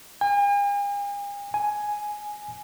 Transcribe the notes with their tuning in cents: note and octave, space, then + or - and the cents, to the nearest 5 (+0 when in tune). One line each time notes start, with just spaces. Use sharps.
G#5 -45
G#5 +5